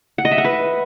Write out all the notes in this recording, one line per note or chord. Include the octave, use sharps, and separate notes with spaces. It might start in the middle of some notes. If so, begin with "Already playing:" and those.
F#5
D#5
E5
F#5
B4